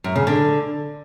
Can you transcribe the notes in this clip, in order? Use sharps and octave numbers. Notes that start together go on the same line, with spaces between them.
F#2
C#3
D3